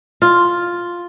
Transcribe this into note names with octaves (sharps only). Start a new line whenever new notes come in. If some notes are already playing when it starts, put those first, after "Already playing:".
F4